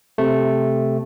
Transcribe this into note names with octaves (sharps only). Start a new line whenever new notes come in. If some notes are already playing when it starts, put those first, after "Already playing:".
C3 A3